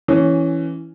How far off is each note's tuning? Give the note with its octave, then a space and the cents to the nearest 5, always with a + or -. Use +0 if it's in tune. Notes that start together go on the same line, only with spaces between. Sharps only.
E3 +0 C#4 +0